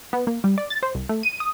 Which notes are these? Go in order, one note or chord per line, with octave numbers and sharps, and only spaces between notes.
B3
A#3
G3
D5
A6
C5
C2
A3
D#7
D#6